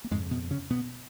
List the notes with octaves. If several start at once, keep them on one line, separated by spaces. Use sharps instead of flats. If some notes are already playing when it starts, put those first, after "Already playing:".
A#3
F2 G#2 C#3 G#3
B2 B3
C#3 C#4
B2 B3